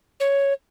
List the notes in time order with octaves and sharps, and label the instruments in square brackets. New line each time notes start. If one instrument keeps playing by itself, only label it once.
[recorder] C#5